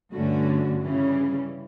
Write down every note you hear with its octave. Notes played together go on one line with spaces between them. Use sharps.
G2 D3 A3 C#4 F#4
C#3 E3 G3 C#4